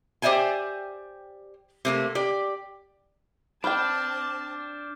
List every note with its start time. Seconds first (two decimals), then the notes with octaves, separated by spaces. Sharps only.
0.22 G4 C5 D5 E5 G5 G#5
1.85 C3 A3 A#3
2.15 G4 D5
3.64 C4 D4 B4 G5 A5 D6 F6 G6